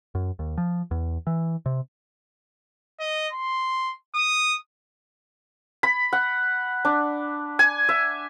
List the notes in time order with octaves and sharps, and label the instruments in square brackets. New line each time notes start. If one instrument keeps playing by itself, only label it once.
[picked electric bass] F#2
D#2
F3
E2
E3
C3
[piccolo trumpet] D#5
C6
D#6
[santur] B5
F#5
D4
G#5
E5